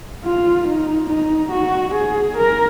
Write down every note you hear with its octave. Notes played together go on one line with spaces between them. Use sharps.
F4
D#4
D#4
F#4
G#4
A#4